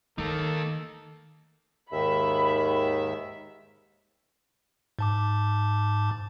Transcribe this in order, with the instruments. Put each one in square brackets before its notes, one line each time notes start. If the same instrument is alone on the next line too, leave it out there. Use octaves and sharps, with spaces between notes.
[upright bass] D#3 [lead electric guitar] A#3 D#4 [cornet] A4
[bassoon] D#2 [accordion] G#2 D#3 E5 [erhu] B5
[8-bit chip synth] G#2 A5 D6